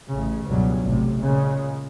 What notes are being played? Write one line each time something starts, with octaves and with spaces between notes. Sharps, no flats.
A1 C#3
C#2 G2 B2 F#3
A1 C3
A#2 C#3 G#3